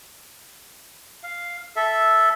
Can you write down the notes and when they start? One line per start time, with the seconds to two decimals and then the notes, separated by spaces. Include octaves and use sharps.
1.23 F5
1.76 A4 E5